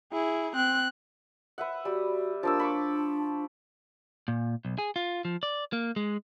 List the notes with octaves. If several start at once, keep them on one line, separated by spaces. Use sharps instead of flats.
E4 G#4
C4 F#6
B4 E5 F#5
G3 F#4
F3 A#3 D4 E6
B5 C#6 D6
A#2
B1
G#4
F4
F3
D5
A#3
G#3